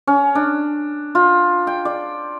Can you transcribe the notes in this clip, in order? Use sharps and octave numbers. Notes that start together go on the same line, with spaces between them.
C#4
D4
F4
G5
D5